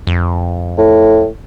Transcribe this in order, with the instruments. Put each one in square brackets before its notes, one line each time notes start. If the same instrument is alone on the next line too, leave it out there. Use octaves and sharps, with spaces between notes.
[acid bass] F2
[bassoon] A2